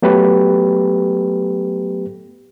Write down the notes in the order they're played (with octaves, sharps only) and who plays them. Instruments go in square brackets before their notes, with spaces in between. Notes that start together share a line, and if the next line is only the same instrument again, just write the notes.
[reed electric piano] F#3 A3 B3 G4 A4 B4